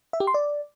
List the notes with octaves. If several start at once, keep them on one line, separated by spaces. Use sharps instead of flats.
E5
G4
C6
D5